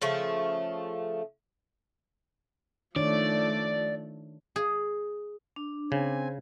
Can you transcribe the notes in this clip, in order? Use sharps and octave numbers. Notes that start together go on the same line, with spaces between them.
C#3 F3 A3
D#3 F3 A3 D4 C#5 D5
G#4
D4
C#3 C4 G#5